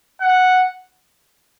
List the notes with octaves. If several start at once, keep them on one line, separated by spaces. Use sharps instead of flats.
F#5